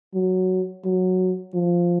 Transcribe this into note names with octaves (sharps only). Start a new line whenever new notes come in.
F#3
F#3
F3